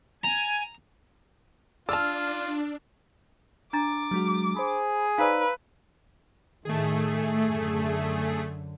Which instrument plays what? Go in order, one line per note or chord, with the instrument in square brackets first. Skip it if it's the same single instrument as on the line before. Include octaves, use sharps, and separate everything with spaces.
[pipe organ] G#5 [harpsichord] A#5
[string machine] D4 [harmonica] F4 [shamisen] D5 A5 [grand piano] E6 F6
[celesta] D4 A#5 A6 [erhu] D6
[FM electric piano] F#3 G#3 F#4
[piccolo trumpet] G#4 [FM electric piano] C5 B5
[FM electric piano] D#4 C5 D5 [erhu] B4 [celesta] F5 A#5 E6
[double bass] A2 D#3 [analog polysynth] A3 G#4
[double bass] F#2 D3